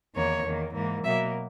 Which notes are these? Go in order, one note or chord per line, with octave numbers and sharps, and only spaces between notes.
E2 D#3 A#3 C#5
E2 D#3 A#3
G#2 E3 A#3
B2 F#3 A#3 E5